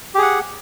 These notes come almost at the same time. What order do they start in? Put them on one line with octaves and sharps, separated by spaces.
G4 G#4 F#5